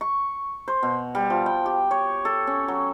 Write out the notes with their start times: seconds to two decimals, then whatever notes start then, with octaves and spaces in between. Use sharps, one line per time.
0.01 C#6
0.68 C5
0.83 B2
1.15 G3
1.30 F3
1.46 G5
1.66 G4
1.91 C#5
2.25 A4
2.47 C#4
2.68 F#3